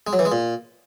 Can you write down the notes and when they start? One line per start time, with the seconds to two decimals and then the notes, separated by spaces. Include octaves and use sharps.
0.07 G#3
0.13 F#3
0.19 E3
0.25 G#3
0.32 A#2